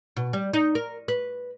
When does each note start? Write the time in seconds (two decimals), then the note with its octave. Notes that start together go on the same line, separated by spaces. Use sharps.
0.16 B2
0.33 G3
0.53 D#4
0.75 A#4
1.08 B4